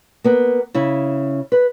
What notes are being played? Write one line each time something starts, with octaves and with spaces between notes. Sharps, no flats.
A#3 B3
C#3 E4
B4